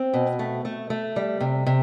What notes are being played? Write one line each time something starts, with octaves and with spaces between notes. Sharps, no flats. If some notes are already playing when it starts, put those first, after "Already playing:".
Already playing: C4
B2
A3
A3
A3
G3
C3
C3